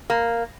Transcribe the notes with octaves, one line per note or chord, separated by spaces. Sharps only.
A#3